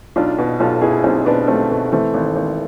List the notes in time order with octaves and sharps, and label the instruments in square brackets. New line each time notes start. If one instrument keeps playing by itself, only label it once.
[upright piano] B1 D4 F4
B2
B1 F4 A4
B2 E4 G#4
B1 C4 E4
B2 B3 D4
B1 A3 C4
B2
E3 A3 C4
G#1
G#1